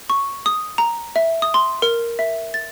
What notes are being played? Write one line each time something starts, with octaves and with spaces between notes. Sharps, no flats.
C#6
D#6
A#5
E5
D#6
C6
A#4
E5
A6